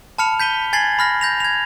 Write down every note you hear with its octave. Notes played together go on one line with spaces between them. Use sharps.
A5 B5 F6 C#7 F7
G6 B6 D#7 G7
G#5 G#6 A6 C7 F#7
B5 F6 A#6
G6 A#6 F7
G#6 F7